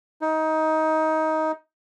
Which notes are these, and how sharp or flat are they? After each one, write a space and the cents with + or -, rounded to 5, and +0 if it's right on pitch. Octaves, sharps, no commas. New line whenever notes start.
D#4 +20